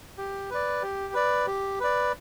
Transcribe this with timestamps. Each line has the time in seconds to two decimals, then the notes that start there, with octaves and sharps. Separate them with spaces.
0.18 G4
0.50 B4 D5
0.82 G4
1.14 B4 D5
1.47 G4
1.80 B4 D5